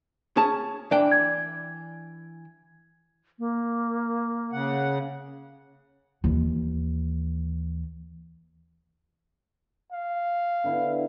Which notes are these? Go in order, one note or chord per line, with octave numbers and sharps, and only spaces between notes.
C#4 G#4 A5
E3 D4 D5 G5
G#6
A#3
C#3 F#5
D#2 E3
F5
D3 B3 E4